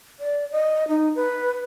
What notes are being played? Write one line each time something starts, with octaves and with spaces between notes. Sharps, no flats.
D5
D#5
D#4
B4